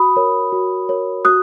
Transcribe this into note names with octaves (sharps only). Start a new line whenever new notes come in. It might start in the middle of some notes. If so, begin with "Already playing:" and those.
Already playing: F#4 B5 D#6
A#4 C#5
F#4
A#4 C#5
F#4 D#6 F#6